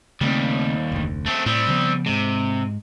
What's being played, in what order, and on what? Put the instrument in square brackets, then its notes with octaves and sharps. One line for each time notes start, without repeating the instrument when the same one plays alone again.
[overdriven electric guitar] D#2 G3 [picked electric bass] C#3 A3 C4
[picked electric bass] F1 D2
[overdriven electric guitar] A3 C4
[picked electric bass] A2 [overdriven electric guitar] G3 C4
[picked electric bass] C#3 F3 B3
[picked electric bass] G#2 G#3 [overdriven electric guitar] C3